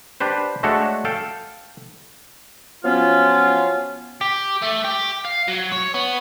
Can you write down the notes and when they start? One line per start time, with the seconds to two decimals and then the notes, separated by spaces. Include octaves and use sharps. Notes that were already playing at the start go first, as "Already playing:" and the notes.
0.20 D4 G4 B4 C5
0.63 G#3 A3 D4 F#4 A4 C#5
1.05 A4 F5 G5
2.84 F3 F#3 B3 C#4 F4
4.21 G4
4.62 A3
4.84 G4
5.25 F5
5.48 F#3
5.71 C#5
5.94 B3